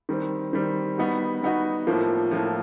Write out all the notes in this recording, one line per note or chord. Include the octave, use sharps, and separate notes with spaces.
D#3 G3 C4
D#3 G3 C4
G3 B3 D#4 F#4
G3 B3 D#4 F#4
A2 F3 A#3
A2 F3 A#3